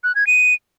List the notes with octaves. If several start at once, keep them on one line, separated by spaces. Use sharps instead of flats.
F#6
G#6
D#7